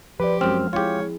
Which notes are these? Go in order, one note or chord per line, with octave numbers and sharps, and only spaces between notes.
F3 G4 B4 C5 D5
F#2 G#3 C4 F6
C4 E4 F4 G4 G#4 C#5